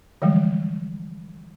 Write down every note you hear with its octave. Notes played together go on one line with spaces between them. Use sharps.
D3 E3 F3 G3 G#3